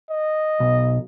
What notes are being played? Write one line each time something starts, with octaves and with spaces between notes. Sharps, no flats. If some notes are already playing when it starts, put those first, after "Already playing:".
D#5
B1